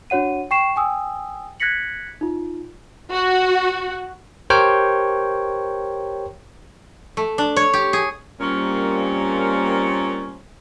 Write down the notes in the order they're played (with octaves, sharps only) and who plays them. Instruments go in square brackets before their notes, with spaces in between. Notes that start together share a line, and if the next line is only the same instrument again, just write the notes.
[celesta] D4 F#4 C#5 F#5 D#7
G5 C#6 C7 E7
G5 G#5 D#6 E6
F#6 G#6 A#6 B6 C#7 F#7
D#4 F4
[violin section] F#4
[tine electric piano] G4 A#4 C5 C#5 G5
[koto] A3
D4
C#5
G4
G#4
[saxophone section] A#2 C#4 [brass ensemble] G3 A#3 C4